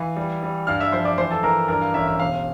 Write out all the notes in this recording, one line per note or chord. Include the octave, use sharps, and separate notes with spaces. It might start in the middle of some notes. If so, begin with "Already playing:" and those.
Already playing: E3 F5
G3
G3
G2 F5 F6
E5 E6
F3 C5 C6
D5 D6
E3 C5 C6
A4 A5
E3 A#4 A#5
G2 A#4 A#5
F5
A1 E5
E5
E1 F5